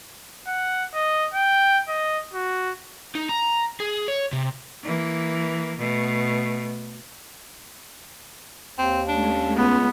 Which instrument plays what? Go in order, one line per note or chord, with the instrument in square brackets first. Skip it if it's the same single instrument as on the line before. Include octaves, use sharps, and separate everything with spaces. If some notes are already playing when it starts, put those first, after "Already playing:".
[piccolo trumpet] F#5
D#5
G5
D#5
F#4
[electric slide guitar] D#4
A#5
G#4
C#5
C3
[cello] E3 A#3
B2 A3
[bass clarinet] D#2 [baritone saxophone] C4
[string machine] G#3 A3 C#4 [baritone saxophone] D4
[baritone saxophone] C#2 [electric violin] B3